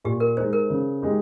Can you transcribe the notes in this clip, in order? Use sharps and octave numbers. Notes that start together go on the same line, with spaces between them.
A#2 G4
A#4
G#3 D#4 C5
A#4
C#3
G#3 D#4 G4